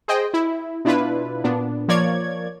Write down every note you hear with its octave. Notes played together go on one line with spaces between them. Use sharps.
G#4 C5 D#5 G5
E4
B2 D4 E4 F4 B4
A#2 B3 D4
F3 A#3 C#5 D5 G#6